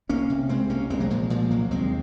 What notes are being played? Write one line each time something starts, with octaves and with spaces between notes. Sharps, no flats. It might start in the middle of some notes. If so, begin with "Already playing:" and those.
C2 A#3 C#4
C3
C3 G#3 C4
C2 A#3 C#4
C2 G#3 C4
F#3 A#3
A#2 F3 G#3
A#2 F3 G#3
C2 F#3 A#3
D#2 G#3 C4